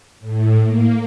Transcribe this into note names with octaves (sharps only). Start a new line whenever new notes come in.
A2
A#3